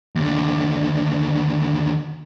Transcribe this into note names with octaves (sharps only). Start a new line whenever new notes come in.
D#2 D3